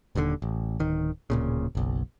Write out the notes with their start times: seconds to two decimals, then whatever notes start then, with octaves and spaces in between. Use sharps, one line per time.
0.15 D#1 D#2 G#2 D3
0.42 A1
0.79 D1 D#3
1.30 D1 A#2 C#3
1.75 F#1 B1